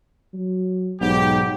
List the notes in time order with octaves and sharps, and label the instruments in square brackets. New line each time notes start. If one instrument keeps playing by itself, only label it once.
[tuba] F#3
[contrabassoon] B1 [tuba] G#2 [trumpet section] G4